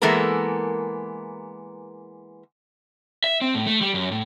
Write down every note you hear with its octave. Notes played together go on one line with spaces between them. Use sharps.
E3 G#3 A#3 B3 A4 A#4
E5
C4
A2
A3
G3
F#2
A2